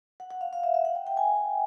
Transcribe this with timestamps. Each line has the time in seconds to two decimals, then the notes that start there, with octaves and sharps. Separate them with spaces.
0.20 F#5
0.31 F#5
0.41 F5
0.53 F5
0.64 E5
0.74 E5
0.85 F#5
0.95 G5
1.07 G5
1.17 G#5